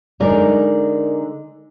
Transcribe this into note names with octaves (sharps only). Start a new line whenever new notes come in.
D3 G#3 D#4 A#4 D5